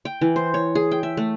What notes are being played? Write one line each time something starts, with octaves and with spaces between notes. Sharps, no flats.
G5
E3
C5
C#5
G#4
G5
E5
A3